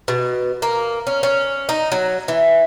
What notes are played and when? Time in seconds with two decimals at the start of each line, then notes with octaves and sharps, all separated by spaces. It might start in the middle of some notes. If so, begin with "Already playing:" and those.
0.08 B2
0.62 A#3
1.07 C#4
1.23 C#4
1.69 D#4
1.92 F#3
2.28 E3